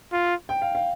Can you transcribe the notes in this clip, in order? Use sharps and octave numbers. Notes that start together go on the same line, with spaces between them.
F4
G5
F5
F5